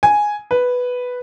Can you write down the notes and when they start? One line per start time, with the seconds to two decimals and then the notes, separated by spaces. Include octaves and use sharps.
0.03 G#5
0.51 B4